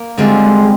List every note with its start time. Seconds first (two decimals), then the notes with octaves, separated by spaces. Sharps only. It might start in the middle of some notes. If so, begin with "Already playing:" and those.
Already playing: A#3
0.18 D3 G3 G#3 C4 F4